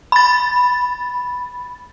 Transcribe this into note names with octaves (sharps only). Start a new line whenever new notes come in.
B5 A6